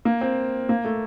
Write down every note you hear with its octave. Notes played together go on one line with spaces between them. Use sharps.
A#3
C4
A#3
A3